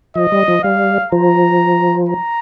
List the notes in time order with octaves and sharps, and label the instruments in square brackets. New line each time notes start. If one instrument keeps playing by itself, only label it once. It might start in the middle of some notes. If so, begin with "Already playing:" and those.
[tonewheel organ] F3 [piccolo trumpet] D#5
[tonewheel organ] G3
F3
[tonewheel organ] G3 [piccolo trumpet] F5
[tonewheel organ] F3 [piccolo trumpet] A#5
[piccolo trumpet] A#5